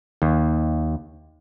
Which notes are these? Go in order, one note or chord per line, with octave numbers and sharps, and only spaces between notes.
D#2